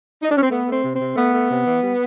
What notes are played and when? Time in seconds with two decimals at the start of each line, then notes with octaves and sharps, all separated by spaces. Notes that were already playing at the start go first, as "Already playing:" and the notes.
0.22 D#4
0.29 D4
0.36 C#4
0.43 C4
0.50 A3 B3
0.66 A3
0.72 C4
0.83 C3
0.94 C4
1.00 C3
1.15 A3 B3
1.32 A3
1.49 C3
1.66 E3
1.81 G3